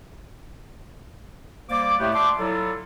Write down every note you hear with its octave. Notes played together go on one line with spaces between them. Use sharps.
G3 A#3 C5 D5 D6
A2 A3 B3 G4
D5 E5 A5 C6 D6
F#3 E4 F4 A4